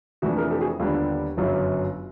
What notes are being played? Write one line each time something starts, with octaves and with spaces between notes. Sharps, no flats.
F2 C3 E3 A3 D4 F#4
G#4 A#4
G4 A4
F#4 G#4
D#2 D3 G3 B3 D4 F4
G1 F#2 C#3 F#3